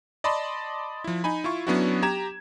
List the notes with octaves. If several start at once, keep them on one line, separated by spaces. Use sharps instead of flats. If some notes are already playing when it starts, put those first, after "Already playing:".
D5 D#5 A5 B5 C6
F3 E4
D#4 G#5 B5
E4 F4 C#6
F#3 B3 C#4 D4 E4 F#4
G4 A#5 G#6 E7